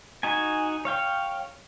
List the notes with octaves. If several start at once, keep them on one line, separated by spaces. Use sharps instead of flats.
D#4 F#4 G#5
C#5 F5 G5